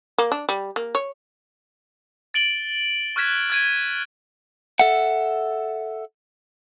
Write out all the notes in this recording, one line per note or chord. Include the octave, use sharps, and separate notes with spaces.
A#3
D4
G3
A#3
C#5
A6 D7 F#7 G7
C#6 F6 F#6 G#6 B6 E7
F6 G#6 D#7
A4 E5 F#5